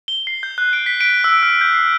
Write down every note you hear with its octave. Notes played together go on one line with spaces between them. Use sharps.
G7
C7
G6
F#6
D7
B6
D7
E6
F6
G6
C7